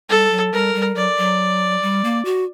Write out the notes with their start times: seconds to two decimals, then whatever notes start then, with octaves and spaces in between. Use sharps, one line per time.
0.09 G3 A4
0.31 F#3
0.53 G3 A#4
0.74 G3
0.96 F#3 D5
1.18 F#3
1.82 G3
2.04 A#3
2.25 F#4